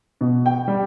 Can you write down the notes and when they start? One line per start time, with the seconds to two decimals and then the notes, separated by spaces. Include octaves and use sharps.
0.21 B2
0.46 G5
0.68 G3